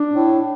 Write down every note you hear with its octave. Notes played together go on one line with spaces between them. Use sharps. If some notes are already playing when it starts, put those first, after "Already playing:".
Already playing: D4
A2